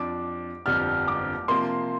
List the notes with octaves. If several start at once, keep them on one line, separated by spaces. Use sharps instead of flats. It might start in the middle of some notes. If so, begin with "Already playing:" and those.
Already playing: F2 F3 D4 D6
G1 F2 F3 D4 G4 F6
D6
C3 F3 A#3 F4 C6